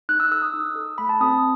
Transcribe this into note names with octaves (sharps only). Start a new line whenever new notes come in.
D#4 F#6
E6
A4 E6
D#6
D#4
A4
A3 B5
A5
C4 F#4 A4 D#6